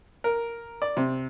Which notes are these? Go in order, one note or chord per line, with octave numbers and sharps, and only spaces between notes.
A#4
D5
C3